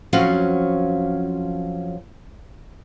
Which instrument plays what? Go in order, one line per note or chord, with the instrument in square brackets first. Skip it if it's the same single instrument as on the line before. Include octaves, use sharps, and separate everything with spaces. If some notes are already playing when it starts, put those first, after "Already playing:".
[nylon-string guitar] F2 F3 F#3 C#4 F#4 F5